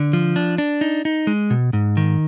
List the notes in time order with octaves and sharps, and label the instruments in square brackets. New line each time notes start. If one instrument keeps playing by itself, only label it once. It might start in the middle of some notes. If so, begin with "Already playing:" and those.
Already playing: [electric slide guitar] D3
F3
D4
D4
D#4
D#4
G#3
B2
G#2
D#3